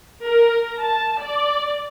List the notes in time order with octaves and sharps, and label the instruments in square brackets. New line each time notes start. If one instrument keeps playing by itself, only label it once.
[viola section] A#4
A5
D5